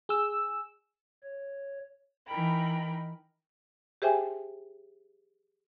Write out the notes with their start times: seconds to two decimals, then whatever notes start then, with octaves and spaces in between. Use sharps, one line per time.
0.09 G#4 E6
1.24 C#5
2.26 E3 D#4 A#4 G5 B5
4.02 G4 G#4 C5 E5 G5 G#5